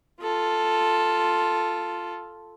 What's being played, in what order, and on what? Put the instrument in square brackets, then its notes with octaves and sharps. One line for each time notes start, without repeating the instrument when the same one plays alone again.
[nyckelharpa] F4 A4